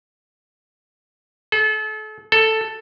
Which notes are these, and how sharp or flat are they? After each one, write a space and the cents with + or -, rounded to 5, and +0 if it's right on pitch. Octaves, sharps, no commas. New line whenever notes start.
A4 -35
A4 +5